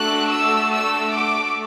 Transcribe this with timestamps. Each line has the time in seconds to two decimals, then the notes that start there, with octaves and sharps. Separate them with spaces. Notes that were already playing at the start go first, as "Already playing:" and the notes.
Already playing: A3 D4 F#4 A4 F#6
0.31 E6
0.73 E6
1.14 D6